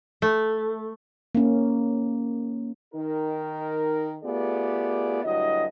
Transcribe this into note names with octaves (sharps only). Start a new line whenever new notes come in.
A3
A#3 C#4
D#3 D#4 A#4
A3 B3 F4 G4 G#4 D5
D2 G2 F#3 E4 D#5